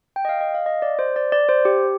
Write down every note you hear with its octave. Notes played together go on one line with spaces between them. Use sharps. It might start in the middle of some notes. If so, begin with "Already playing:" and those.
G5
D#5
F5
D#5
F5
D#5
D5
C5
D5
D5
C5
G4